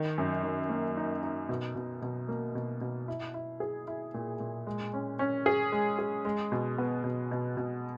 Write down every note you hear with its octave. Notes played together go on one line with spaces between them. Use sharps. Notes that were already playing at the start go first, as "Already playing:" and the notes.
Already playing: D#3
F#2
D#3
A#3
D#4
D#4
B2
B2
B2
A#3
B2
B2
E4
E4
G#4
E4
A#2
A#2
G#3
C#4
C#4
G#4
G#3
G#4
G#3
B2
B3
B2
B2
B2